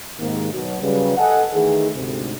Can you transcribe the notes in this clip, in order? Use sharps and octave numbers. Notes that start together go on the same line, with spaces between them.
G#2 C3 D#3 A#3
B2 D#3 F#3
C#3 F#3 G3 B4
A4 D#5 F#5 G#5
D#3 E3 A3 D#4 G#4
D2 G#2 C3